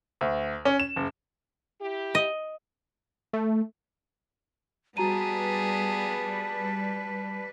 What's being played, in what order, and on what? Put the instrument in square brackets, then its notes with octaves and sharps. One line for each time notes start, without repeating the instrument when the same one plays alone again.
[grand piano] D2
C#4
E7
F#1
[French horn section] E4 G4
[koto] D#5
[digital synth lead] A3
[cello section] G3 B4 [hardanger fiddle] B3 G#4 [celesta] F#4 A#5 D#7 [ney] A5